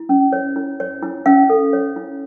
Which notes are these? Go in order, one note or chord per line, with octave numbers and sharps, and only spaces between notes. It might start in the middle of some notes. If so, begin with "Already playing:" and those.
Already playing: E4
C#4
C#5
E4
C#5
E4
C#4 F5
A4
C#5
E4